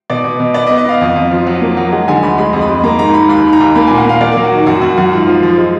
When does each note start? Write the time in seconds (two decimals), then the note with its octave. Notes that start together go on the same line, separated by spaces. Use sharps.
0.10 B2 D5
0.24 B2
0.40 B2
0.54 B3 D5
0.67 D#5
0.70 B3
0.78 D#5
0.85 B3 F5
1.01 F2
1.16 F2
1.31 F3
1.47 F#3
1.61 A#3
1.77 F#3
1.92 G#3 F#5
2.08 D3 G#5
2.23 D2 B5
2.38 G#3 B5
2.53 F2
2.61 B5
2.68 G#3
2.83 A#3 A#5
2.99 G#2 A#5
3.14 G#2 B5
3.29 D#2 B5
3.44 D#3
3.53 A#5
3.60 D#2
3.75 A#3 B5
3.87 A#2 G#5
3.98 F#5
4.05 A#3 F5
4.21 A#3 D5
4.32 F#3 A#4
4.43 F#4
4.51 D#3
4.66 F#2 F#4
4.81 F#2 F#4
4.97 F#2 F#4
5.12 G#2 F4
5.27 F3
5.43 F3
5.58 G#3